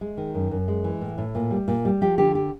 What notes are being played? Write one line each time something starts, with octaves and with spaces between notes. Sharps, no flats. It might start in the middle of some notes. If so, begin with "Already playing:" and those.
G#3
D#3
F#2
F#2
G#3
E3
A2
A2
A#2
G3
A#2
G3
F3 G4
D3 G4
G4